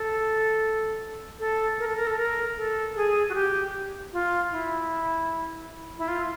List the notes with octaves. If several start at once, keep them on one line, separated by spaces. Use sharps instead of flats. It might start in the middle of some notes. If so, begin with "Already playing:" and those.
Already playing: A4
A4
A#4
A4
A#4
A4
A#4
A4
G#4
F#4
G4
F4
E4
E4
F4